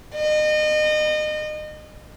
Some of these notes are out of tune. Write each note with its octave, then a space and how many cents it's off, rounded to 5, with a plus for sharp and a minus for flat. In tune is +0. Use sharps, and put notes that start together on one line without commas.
D#5 -30